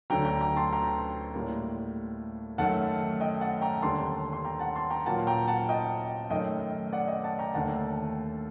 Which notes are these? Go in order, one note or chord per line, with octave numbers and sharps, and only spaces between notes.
D2 D3 F#3 G5 A#5
G5 A#5
G5 A#5
A5 C6
G5 A#5
A2 G3 A#3
F#2 D#3 A3 F#5 A5
D#5 G5
F#5 A5
G5 A#5
D#2 D3 G3 A5 C6
C6
G5 A#5
F#5 A5
A5 C6
G5 A#5
A#2 F#3 A#3 F#5 A5
G5 A#5
F#5 A5
D#5 G5
F#2 D#3 A3 D#5 G5
D5 F#5
D#5 G5
F#5 A5
G5 A#5
D#2 D3 A3 F#5 A5